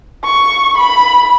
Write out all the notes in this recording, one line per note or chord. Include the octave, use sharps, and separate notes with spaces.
C#6
B5